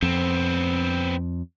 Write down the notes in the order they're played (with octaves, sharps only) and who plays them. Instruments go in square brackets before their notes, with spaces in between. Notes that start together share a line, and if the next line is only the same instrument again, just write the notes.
[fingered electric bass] F2 [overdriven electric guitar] B3 C4